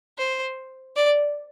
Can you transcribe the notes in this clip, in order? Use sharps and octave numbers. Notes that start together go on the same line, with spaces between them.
C5
D5